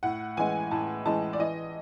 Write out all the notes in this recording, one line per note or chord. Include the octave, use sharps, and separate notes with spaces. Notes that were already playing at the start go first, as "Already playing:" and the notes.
A2 F#5
E3 G#3 G#5
A2 A5
E3 G#3 A5
D5
E3 D#5